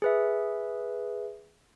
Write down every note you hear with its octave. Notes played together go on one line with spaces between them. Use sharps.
G#4 B4 E5